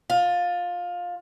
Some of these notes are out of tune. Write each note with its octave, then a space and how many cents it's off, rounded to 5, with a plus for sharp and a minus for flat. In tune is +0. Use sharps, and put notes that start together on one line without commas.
F4 +20